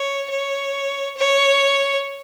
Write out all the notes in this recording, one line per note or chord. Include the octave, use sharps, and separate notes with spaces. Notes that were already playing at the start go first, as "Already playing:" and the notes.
Already playing: C#5
C#5
C#5